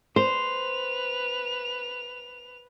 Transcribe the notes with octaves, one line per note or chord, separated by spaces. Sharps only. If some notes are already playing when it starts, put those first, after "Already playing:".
B4 C5 F7